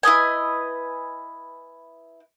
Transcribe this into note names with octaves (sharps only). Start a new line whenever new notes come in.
E4 B4 D#5 G#5